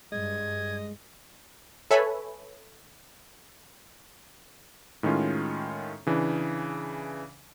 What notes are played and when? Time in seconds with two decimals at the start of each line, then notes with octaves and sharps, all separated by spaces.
0.12 G2 G#3 D#5 G#6
1.91 A4 B4 C#5 E5 G#5 B5
5.03 A2 D#3 G#3 C#4 F4
6.07 C#3 E3 D4